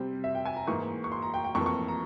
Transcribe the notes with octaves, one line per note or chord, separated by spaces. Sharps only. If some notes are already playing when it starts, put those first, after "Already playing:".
Already playing: C3 G3 C4
E5
G5
G#5
A#5
G#2 E3 A#3 C#6
C#6
C6
A#5
G5
G5
F2 E3 A#3 C#6
C#6
A#5